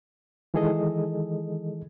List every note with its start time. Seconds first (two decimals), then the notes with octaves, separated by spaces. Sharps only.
0.54 D#3 E3 G#3 G#4 A4 D#5